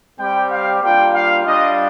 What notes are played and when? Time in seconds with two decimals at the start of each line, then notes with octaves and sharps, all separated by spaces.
0.19 G3 C4 G4 G5
0.51 F5
0.83 G3 A#3 D4 F4 G5
1.14 F5
1.46 G3 D4 F4 D#5